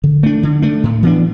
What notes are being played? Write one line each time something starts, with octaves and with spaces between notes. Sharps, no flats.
D3
A3 D4
D3
A3 D4
A2
E3 B3 D4